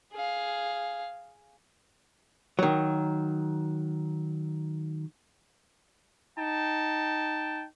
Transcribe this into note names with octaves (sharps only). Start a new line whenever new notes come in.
G#4 F5
D#3 F#3
D#4 G5 A5